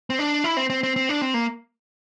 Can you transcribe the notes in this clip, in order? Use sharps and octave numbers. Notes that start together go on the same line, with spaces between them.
C4
D4
E4
C4
C4
C4
C4
D4
C4
A#3